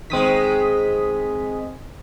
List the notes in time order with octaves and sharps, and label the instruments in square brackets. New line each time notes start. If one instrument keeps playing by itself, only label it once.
[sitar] D#3 G#3 [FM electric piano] C4 D#6 B6